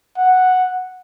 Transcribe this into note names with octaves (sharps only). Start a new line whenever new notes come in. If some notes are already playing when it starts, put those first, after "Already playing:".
F#5